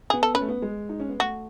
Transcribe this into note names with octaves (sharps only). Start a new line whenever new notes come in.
B3 G#4
A4
C#4 B4
A3
B3
G#3
D#4
C#4
B3
A3 F#4